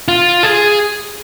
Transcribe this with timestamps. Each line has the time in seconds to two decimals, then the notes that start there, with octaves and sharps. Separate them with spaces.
0.08 F4
0.43 G#4